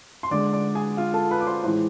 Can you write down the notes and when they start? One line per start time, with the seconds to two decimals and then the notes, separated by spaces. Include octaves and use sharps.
0.23 C6
0.31 D3 G#3 D5 D6
0.53 D5 D6
0.75 G#4 G#5
0.97 F4 F5
1.14 A4 A5
1.31 B4 B5
1.41 D6
1.47 C5 C6
1.63 A2 E3 G#3 C5 C6